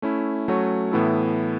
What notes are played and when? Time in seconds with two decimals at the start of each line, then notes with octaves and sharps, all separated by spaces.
0.02 A3 C#4 E4
0.48 F#3 A3 C#4 F#4 C#5
0.92 A2 E3 B3 E4 A4